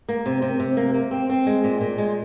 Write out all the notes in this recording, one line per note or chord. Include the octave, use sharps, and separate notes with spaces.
A#3
C3
C3
C3
A#3
A#3
C4
C4
G#3
A#2
A#2
G#3